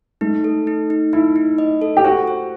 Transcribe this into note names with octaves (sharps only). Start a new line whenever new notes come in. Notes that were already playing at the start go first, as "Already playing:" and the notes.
A3 D#4
A4
D#4
D#4
D#4 E4
D#4
D#5
A4
G4
F#4 C5
C5